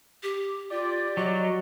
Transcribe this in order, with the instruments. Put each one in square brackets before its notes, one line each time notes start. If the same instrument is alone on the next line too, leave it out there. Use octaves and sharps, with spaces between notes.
[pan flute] G4
[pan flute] F4 [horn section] G4 D5
[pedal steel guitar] F#3 [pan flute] D#5